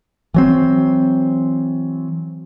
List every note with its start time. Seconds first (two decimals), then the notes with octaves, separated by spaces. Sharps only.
0.34 E3 F#3 C4